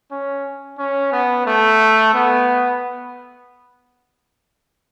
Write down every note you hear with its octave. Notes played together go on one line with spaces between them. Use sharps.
C#4
C#4
B3
A3
B3